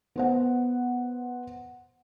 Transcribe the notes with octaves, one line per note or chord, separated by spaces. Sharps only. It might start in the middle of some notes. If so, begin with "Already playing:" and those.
B3 C5 F#5